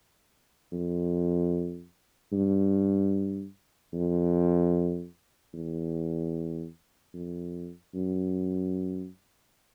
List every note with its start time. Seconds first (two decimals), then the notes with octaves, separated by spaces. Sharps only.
0.72 F2
2.33 G2
3.93 F2
5.54 E2
7.14 F2
7.95 F#2